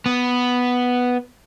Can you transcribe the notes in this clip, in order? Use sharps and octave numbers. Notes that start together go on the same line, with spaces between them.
B3